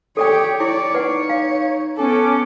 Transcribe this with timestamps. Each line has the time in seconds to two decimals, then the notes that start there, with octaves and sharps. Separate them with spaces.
0.17 G4 A4 C#5 D5 G5
0.60 E4 C#5 D5
0.94 D#4 B4 D5 F#5
1.29 F5
1.98 B3 C#4 A4 G#5 D6